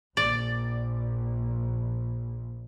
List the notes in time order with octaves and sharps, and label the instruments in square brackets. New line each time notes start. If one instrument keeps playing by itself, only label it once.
[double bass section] A#1 [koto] D5